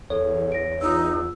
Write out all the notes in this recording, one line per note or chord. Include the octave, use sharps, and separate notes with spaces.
E2 A4 C#5
A#6 D7
D#4 F4 E6